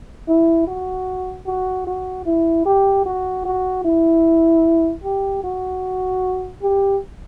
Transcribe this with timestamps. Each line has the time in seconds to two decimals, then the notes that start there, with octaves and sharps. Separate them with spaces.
0.28 E4
0.67 F#4
1.47 F#4
1.87 F#4
2.26 E4
2.66 G4
3.06 F#4
3.46 F#4
3.85 E4
5.04 G4
5.44 F#4
6.62 G4